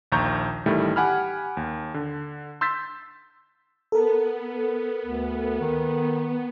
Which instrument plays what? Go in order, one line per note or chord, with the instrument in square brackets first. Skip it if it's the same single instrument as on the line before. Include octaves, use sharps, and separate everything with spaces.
[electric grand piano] A#1 D#2 A#5 C#6 G6
A1 D#3 G3 A3 E4
G4 F#5 G#5 B5 F6
D#2
D3
C6 E6 G6 A6 B6
[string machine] B3 [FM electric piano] A4 A#4
[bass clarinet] D2
D#3